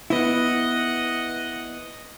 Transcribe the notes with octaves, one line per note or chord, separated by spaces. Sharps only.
B3 E4 D#5 F#5